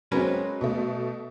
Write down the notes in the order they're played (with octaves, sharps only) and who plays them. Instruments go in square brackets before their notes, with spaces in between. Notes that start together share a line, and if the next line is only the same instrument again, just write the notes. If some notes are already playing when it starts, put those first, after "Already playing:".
[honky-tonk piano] F#3 G#3 C4 [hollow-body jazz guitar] C#4 A#4 B4
[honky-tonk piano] B2 A3